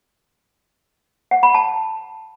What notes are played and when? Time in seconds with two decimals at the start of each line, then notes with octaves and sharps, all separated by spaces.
1.31 F#5
1.43 B5
1.54 A5